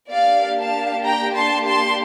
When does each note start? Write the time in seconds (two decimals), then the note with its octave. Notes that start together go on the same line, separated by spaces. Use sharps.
0.11 A#3 D4 G4 D5 F5
0.58 F5 A5
1.04 G5 A#5
1.36 A5 C6
1.67 A5 C6